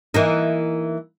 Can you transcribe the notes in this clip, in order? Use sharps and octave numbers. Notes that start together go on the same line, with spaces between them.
E3 A#3 D#4